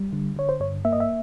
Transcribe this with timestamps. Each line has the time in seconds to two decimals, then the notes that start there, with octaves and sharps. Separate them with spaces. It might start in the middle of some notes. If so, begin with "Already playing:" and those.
Already playing: G3
0.13 D3
0.36 D3 C#5
0.49 C5
0.60 G2 C#5
0.85 A#3 E5
0.93 D#5
1.00 E5